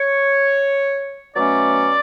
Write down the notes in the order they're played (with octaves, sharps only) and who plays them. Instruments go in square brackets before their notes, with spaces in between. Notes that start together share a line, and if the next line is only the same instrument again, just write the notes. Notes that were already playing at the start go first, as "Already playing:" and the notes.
Already playing: [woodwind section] C#5
B2 F#3 A3 C#4 D5